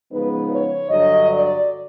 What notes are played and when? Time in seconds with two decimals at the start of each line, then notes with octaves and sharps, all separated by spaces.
0.11 C#3 F3 G#3 B3 D#4 B4
0.51 C#5
0.90 G2 D3 F#3 D#5
1.31 D5